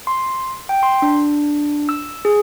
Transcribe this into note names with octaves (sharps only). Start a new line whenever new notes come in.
C6
G5
C6
D4
E6
G#4